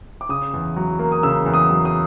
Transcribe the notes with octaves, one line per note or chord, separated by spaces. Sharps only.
D6
C#3 D#6
E2
F#3
A#3
D#6
C#3 E6
E2
D#6
F#3
D#6